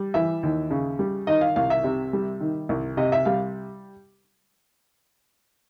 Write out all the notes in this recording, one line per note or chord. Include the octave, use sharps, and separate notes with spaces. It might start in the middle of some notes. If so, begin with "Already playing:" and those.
Already playing: G3
E3 E5
D#2
C#3
G3
D#3 D#5
F5
C2 F5
E5
C3
G3
D#3
C2
C3 D#5
E5
G3 F5